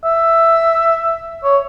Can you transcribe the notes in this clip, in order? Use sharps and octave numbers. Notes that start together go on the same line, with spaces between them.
E5
C#5